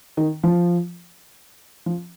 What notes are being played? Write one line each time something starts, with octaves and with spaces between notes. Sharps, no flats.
D#3
F3
F3